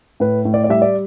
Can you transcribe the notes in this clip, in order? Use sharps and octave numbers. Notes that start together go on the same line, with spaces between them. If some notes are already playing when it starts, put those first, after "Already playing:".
A2 B4
A2
D5
D5
G3 E5
D5